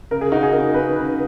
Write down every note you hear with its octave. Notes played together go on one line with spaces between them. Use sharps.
C#3 A#4
G#4
D#4 F#4
G#4
D#4 A#4
C#3 B4
C#3 B4